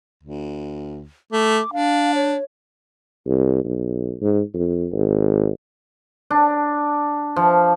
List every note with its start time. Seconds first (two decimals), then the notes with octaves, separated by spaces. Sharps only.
0.23 D2
1.32 A3 D6
1.73 D4 F5
2.15 C#5
3.26 C2
3.64 B1
4.21 G#2
4.54 F2
4.92 G#1
6.30 D4
7.36 F3